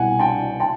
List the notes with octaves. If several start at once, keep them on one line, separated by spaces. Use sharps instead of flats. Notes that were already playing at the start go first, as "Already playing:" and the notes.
Already playing: C2 B2 F#5 G#5
G5 A5
G5 A5